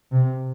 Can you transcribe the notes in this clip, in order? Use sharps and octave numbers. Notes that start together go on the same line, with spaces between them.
C3